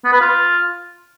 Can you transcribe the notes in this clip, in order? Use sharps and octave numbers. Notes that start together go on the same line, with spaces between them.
B3
B4
F4